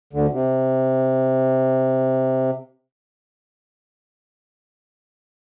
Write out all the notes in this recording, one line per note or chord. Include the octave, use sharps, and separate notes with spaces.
D2 D3
C3